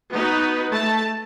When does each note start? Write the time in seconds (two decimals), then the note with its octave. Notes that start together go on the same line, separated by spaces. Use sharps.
0.14 B3 D#4 F#4 B4
0.71 A3 A5